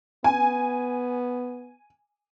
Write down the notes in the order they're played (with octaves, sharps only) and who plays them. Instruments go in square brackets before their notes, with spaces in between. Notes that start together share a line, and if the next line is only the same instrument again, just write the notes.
[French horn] B3 [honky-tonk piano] G#5